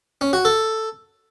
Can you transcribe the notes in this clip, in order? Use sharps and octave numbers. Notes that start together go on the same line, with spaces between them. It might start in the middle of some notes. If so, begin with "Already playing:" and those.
C#4
F#4
A4